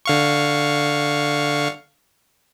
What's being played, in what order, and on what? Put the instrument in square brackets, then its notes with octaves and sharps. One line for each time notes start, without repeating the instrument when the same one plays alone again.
[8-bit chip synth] D3 F5 C#6